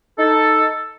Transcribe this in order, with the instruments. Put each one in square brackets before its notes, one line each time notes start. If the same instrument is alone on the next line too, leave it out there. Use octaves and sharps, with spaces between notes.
[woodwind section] D#4 A4